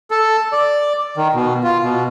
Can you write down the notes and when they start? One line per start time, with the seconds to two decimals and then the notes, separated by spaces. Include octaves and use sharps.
0.11 A4
0.52 D5
1.17 D#3
1.34 B2
1.64 F4
1.83 B2